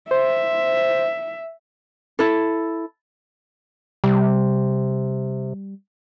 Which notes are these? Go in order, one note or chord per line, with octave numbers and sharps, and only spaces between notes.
C5 E5
E4 A4
C3 G3